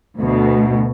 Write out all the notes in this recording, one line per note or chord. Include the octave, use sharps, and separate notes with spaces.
D2 B2